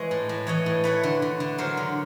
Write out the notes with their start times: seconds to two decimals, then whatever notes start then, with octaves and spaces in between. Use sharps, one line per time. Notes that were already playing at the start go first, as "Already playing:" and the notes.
Already playing: E3 G#3 C#5 D#5
0.11 A2
0.29 A2
0.47 E3 C#5 D#5
0.66 A2
0.84 A3 B4 C#5
1.03 D3
1.22 D3
1.40 D3
1.58 F#3 A#4 C5
1.77 D3